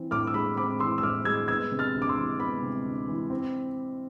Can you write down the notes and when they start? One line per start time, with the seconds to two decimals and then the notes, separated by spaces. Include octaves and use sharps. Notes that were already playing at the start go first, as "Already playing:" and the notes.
Already playing: E3 C4
0.11 A2 D6 F6
0.27 E6
0.34 G#3 B5 D6
0.57 C4 B5 D6
0.80 E3 C6 E6
0.98 E6
1.03 A2 D6 F6
1.25 G#3 E6 G#6
1.48 B3 E6 G#6
1.71 C3
1.79 F6 A6
1.94 D2
2.02 D6
2.09 C6 E6
2.16 E3
2.39 B3 B5 D6
2.62 C3
2.85 D2
3.08 E3
3.30 C4